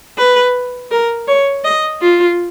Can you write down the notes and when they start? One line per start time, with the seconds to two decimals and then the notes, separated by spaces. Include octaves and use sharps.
0.18 B4
0.91 A#4
1.27 C#5
1.64 D#5
2.01 F4